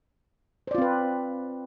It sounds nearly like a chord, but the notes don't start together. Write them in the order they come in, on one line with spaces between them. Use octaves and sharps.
C5 D5 F4 C4 B4